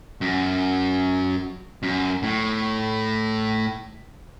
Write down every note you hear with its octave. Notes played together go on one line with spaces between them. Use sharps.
F#2
F#2
A2